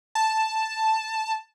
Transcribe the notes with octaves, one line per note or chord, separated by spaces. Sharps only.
A5